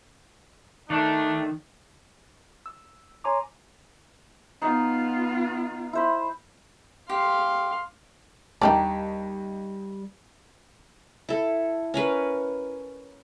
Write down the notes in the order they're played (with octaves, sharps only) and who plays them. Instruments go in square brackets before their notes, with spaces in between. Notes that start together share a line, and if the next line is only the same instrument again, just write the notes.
[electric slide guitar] D#3 [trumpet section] A3 D4
[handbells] E6
C#5 G#5 A#5 C6 D6
[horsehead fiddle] B3 F4 [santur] D#4
[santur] E4 C5 B5
[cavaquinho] G4 [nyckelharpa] F5 C6
[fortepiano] D#2 A5 [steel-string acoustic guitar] G3 [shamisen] D4 G4 D5 [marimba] G5 A#5
[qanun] E4 A4
C#4 A#4 B4